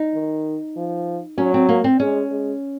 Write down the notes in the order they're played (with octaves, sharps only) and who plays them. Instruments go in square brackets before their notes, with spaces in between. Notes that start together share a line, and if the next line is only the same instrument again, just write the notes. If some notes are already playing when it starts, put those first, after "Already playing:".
Already playing: [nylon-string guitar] D#4
[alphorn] D#3
F3
[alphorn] F#3 [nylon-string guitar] C#4
[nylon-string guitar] C4
A#3
C4
[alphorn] G#3 [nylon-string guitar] C#4
[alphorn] G#3